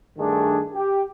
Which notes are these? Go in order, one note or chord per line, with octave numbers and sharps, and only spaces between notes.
G2 D#3 A3 D4 G#4
G4